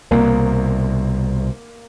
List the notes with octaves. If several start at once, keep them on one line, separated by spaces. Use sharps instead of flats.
C2 B2 A#3